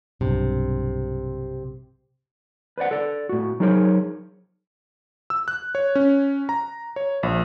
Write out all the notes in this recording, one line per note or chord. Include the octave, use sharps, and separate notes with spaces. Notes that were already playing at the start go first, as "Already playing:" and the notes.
B1 G2 C3
B4 C5 D5 F#5
A4 D5
A2 F#4
F#3 D#4 G#4 A#4 C5 C#5
E6
F#6
C#5
C#4
A#5
C#5
A#1